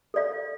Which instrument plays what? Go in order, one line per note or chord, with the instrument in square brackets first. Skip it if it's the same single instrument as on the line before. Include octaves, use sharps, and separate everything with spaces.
[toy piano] A4 D5 F5